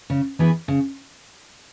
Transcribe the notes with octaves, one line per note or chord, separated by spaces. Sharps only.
C#3
E3 B3 E4 G#4
C#3